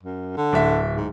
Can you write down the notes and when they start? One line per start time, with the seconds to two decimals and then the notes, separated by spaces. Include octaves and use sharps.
0.03 F#2
0.37 D3
0.53 D1 E5
0.96 G#2